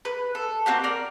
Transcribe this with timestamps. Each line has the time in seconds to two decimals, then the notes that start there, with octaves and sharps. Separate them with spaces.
0.05 B4
0.35 A4
0.66 A#3 C4 F#4 G4
0.84 A#4 D5